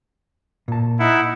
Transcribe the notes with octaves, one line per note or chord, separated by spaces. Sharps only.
A#2 A5
D#4 E4 F#5